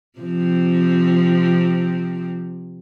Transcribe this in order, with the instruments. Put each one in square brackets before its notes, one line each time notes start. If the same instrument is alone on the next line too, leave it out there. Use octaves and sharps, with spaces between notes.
[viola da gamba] C3 F3 C4